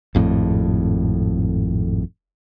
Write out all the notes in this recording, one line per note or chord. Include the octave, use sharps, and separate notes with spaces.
G#1 F2 A2